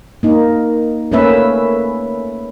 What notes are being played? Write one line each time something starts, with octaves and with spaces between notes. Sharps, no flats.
A#3 D#4
A3 A#3 C#4 B4 E5